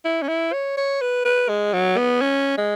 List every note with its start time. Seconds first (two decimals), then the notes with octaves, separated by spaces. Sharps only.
0.05 E4
0.23 C#4
0.29 E4
0.53 C#5
0.77 C#5
1.02 B4
1.25 B4
1.49 G#3
1.73 F#3
1.97 B3
2.21 C#4
2.57 G#3